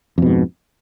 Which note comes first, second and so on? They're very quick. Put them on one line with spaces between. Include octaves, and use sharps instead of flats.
F2 B2 G#2